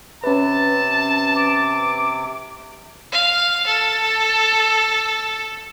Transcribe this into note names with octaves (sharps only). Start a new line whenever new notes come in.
C3 C#4 B4 A5
D6
F5
A4